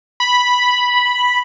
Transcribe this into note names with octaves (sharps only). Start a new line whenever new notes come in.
B5